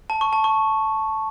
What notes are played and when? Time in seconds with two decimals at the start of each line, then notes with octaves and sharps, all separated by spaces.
0.10 A5
0.21 C#6
0.33 A5
0.44 C#6